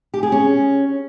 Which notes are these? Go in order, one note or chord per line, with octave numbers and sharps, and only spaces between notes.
G4
G#4
C#4